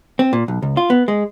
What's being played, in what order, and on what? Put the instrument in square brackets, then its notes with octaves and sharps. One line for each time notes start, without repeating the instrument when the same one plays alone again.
[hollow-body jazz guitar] C4
A#2
B1
C#2
F4
B3
G#3